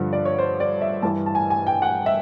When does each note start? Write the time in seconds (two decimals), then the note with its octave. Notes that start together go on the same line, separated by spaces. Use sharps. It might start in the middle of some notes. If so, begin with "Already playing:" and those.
Already playing: G2 D3 F3
0.13 D5
0.25 C#5
0.39 C5
0.60 D5
0.81 E5
1.02 G2 E3 A5
1.26 A5
1.35 G#5
1.50 G#5
1.67 G5
1.82 F#5
2.06 E5